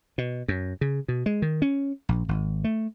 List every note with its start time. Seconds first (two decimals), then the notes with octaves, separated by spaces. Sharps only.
0.18 B2
0.48 F#2
0.81 C#3
1.08 B2
1.26 G#3
1.42 D#3
1.62 C#4
2.09 A#1
2.29 G#1
2.64 A3